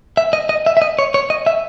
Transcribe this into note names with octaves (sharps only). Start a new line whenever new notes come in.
E5
D#5
D#5
E5
E5
D#5
C#5
C#5
D#5
E5